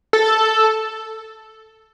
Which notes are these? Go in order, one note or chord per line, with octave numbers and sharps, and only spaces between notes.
A4